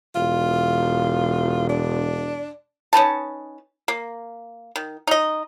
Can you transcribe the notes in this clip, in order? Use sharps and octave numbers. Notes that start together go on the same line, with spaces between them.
E1 F4
D4
C#4 D#4 B4 A5
A#3
D#3
D#4 D#5